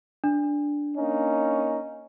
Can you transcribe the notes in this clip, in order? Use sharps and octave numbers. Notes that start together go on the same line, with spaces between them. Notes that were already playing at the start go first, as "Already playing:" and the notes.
D4
A#3 C#4 D#4